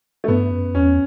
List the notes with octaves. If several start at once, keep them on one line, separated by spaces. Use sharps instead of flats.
A3
G2 B3
F#2
E2 C#4